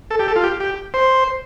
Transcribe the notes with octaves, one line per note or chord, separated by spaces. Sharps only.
A4
G4
A4
F4
G4
G4
C5